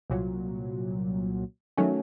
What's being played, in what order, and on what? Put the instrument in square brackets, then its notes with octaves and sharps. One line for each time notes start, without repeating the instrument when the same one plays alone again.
[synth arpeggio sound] C2 A#2 F#3
D#3 F#3 A3 C#4